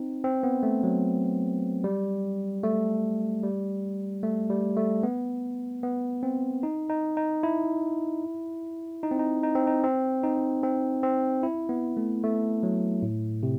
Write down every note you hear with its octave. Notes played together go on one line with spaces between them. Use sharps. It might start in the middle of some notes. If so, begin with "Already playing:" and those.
Already playing: C4 D#4
C4
B3
A3
F#3
G3
A3
G3
A3
G3
A3
B3
B3
C4
D#4
D#4
D#4
E4
D#4
C4
D#4
D#4
C4
D#4
C4
D#4
C4
C4
E4
B3
A3
A3
F#3
A2
C3